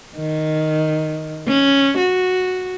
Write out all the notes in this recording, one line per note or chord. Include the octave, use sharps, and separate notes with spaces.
D#3
C#4
F#4